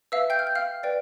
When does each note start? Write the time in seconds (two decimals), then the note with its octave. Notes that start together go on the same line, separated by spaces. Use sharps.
0.12 B4 E5 F5 E6
0.30 G5 G6
0.39 F6
0.47 G6
0.55 F5 F6
0.83 B4 D5 G5